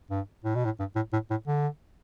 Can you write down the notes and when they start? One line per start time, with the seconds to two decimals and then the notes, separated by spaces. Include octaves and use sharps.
0.10 G2
0.44 A2
0.55 B2
0.65 A2
0.79 G2
0.96 A2
1.13 A2
1.31 A2
1.47 D3